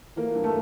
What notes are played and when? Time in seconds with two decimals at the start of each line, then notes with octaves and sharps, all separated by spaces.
0.16 E3 A#3
0.35 G2
0.44 A3